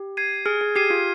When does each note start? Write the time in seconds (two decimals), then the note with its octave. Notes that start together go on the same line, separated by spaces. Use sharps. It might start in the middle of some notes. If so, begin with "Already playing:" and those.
Already playing: G4
0.17 G#6 C7 D#7
0.46 G#4 F6
0.61 G#4
0.75 G4 G#6 C7 D#7
0.90 F4